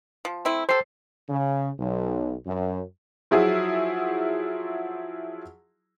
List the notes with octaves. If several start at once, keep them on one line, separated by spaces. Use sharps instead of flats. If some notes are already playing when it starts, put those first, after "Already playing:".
F3
A3 C4 E4
G4 A4 C5 C7
C#3
B1
F#2
F3 F#3 E4 F4 G#4